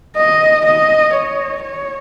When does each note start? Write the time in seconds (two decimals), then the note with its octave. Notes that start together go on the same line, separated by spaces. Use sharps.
0.17 D#5
0.66 D#5
1.14 C#5
1.62 C#5